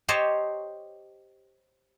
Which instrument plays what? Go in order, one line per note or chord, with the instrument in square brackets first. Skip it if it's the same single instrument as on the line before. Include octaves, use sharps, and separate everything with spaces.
[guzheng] G4 C5 C#5 D#5 A5